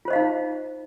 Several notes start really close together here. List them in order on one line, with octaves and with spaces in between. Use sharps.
F4 C5 D#5 F5 D#4